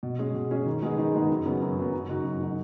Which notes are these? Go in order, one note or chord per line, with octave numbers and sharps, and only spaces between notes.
B2
G#3 C#4 G#4
B2
G#3 C#4 G#4
D#3
G#3 B3 D#4 G#4
D#3
G#3 B3 D#4 G#4
F#2
C#3 F#3 B3
F#2
C#3 F#3 B3
F#2
C#3 F#3 D#4 F#4
F#2
C#3 F#3 D#4 F#4